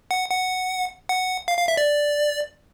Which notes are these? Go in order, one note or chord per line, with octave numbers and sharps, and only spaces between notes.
F#5
F#5
F#5
F5
F5
E5
D5